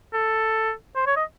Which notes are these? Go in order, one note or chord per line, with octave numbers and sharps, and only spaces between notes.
A4
C5
C#5
D#5